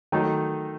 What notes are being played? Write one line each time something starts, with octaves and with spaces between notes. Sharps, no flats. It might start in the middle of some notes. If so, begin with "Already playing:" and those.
D#3 F#3 A3 D#4